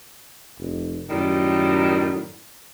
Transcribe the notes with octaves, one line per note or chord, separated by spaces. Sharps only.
F1
F#2 A2 D#3 G3